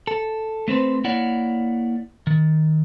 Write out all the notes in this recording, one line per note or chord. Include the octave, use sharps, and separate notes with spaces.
A4
A3 C4 B4 C5
A#3 E4 C#5 D5 F#5
D#3